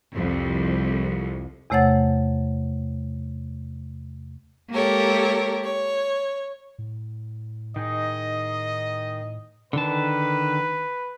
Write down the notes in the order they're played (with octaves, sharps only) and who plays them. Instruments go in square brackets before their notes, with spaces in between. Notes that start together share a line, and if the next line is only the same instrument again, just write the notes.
[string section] C2 F2
[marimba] E2 C3 A3 C#5 F#5 A6
[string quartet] G#3 A#3 G4 A4 A#4 C#5
C#5
[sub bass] A2
[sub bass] A2 [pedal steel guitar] D#3 D#4 G#4 [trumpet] D#5
[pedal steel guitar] D3 D#3 A5 [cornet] B4